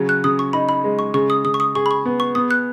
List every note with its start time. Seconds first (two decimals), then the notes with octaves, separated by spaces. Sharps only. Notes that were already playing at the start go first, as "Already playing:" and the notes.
Already playing: C#3 F#3 C#4
0.09 F#6
0.24 C#3 D#6
0.39 C#6
0.53 D#4 B5
0.69 B5
0.84 G#3
0.99 C#6
1.14 C#3 C#6
1.30 D#6
1.44 C#3 D#6
1.54 C#6
1.60 D#6
1.75 G#4 C#6
1.86 B5
1.91 C#6
2.06 B3
2.20 C#6
2.35 B3 D#6
2.51 F#6